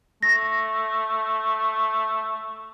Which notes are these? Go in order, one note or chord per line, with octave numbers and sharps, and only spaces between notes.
A3 A#6